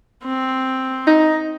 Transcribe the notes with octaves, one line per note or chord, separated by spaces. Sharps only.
C4
D#4